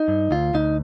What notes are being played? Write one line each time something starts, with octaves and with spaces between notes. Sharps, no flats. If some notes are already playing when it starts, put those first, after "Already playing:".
Already playing: D#4
G2
D2 F4
D2 D#4